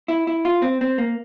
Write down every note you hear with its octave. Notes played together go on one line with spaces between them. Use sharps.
E4
E4
F4
C4
C4
A#3